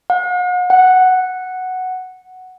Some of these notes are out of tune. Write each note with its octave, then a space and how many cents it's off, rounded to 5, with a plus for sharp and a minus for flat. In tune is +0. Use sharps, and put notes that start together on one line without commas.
F#5 -40
F#5 +0